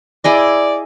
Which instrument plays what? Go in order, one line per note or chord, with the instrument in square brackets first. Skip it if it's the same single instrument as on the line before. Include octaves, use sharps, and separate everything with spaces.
[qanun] E4 G#4 D#5 [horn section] D5